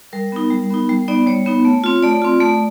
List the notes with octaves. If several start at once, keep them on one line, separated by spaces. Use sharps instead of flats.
G3 A#4
B3 D#4
G3
B3 D#4
G3
B3 D#4 D5
G3 C#5
B3 D#4
A3
C4 F4
A3 D5
C4 F4
A3